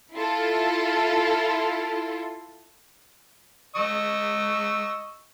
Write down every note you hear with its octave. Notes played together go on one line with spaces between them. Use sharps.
E4 F4 A4
D#5 C#6 E6